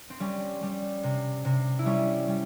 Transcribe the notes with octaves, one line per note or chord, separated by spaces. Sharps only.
C4
G3 C#4
G3
C3
C3
E4
G3 C#4
G3